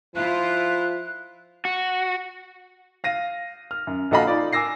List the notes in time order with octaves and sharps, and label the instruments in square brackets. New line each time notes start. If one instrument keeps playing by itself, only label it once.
[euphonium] F3 [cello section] E4 F4 C5 [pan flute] F#6
[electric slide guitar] F#4
[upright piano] F5 A#6 D#7
F6
F#2
A#1 F#4 A4 D#5 F5 B5
D#4 F4 D5
G#5 D6 E6 A#6 C7